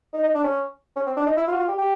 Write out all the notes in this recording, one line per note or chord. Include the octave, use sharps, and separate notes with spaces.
D#4
D#4
D4
C#4
C#4
C4
D4
D#4
E4
F4
F#4
F4
G4
G4